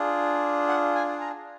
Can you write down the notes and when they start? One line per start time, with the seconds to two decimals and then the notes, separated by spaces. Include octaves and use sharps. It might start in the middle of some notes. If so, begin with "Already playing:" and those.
Already playing: D4 F4 G#4
0.68 F#5
0.95 G#5
1.21 A#5